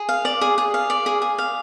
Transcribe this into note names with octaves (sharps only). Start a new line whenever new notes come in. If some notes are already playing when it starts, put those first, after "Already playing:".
Already playing: G#4
F5
D5
G#4
G#4
F5
D5
G#4
G#4
F5